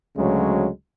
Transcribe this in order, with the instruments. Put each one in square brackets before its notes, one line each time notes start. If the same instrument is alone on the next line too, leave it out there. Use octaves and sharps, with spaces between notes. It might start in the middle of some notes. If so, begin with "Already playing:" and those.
[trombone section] D2 C#3 F#3 G#3